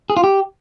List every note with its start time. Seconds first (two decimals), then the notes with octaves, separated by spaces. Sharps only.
0.10 G#4
0.17 F4
0.24 G4